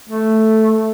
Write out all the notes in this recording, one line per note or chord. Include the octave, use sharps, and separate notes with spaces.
A3